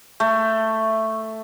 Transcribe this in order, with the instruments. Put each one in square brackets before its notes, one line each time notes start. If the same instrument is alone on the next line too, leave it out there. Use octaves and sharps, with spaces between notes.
[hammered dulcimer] A3